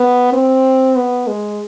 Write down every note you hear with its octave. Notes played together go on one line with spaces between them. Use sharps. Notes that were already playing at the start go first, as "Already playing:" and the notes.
Already playing: B3
C4
B3
G#3